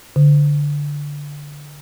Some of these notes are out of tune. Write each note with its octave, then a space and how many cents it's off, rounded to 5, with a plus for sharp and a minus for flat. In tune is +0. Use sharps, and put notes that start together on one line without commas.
D3 -10